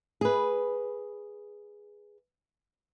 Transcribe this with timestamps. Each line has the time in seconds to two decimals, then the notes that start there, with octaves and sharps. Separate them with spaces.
0.21 G#4 B4